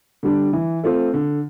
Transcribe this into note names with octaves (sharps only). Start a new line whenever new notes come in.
D3 G3 D4
E3
A3 C4 F4 A4
D3